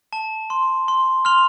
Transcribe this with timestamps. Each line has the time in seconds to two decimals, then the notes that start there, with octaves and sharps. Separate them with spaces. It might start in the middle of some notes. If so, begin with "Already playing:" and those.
0.13 A5
0.50 C6
0.88 C6
1.25 C6 F6 F7